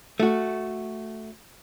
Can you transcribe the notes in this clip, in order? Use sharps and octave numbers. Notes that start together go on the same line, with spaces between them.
A3 F#4